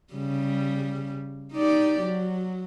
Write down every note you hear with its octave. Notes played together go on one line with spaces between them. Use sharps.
C#3 G3
D#4 G4 D5
F#3